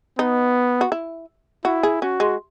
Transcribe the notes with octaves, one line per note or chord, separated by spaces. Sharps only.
B3 D#4
F#4
E4
E4 F#4
G#4
C#4 F#4
G#3